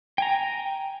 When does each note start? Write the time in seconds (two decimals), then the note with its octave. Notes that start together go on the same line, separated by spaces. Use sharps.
0.18 G5 G#5 A#5